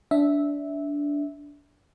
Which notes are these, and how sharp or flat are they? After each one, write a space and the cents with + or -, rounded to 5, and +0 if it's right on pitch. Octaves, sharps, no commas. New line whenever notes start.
D4 -20 E5 -10